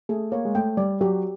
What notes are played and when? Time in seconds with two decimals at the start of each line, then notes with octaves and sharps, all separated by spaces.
0.09 A3 G#4
0.32 A#3 C#5
0.45 G#3
0.55 A3 G5
0.77 G3 D5
1.01 F#3 G4